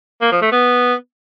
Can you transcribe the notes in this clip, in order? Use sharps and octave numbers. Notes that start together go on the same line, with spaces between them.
A#3
F3
A3
B3